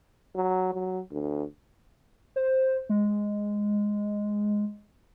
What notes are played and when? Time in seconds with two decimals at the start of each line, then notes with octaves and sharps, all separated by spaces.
0.35 F#3
0.73 F#3
1.11 D2
2.36 C5
2.89 G#3